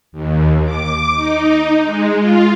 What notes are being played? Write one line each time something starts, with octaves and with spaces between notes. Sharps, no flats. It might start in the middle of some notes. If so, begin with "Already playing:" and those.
D#2
D6
D#4
G#3
F4